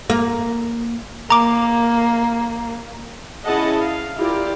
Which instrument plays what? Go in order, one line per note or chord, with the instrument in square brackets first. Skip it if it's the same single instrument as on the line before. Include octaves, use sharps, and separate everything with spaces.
[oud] A#3
[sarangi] A#3 [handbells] A#5 D6
[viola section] C#4 E4 G#4 D#5 F#5 A5
F5
E4 F4 G4 A#4 D5